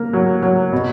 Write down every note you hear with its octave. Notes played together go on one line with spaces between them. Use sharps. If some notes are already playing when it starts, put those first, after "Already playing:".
Already playing: A#3
F#3
F#3
B2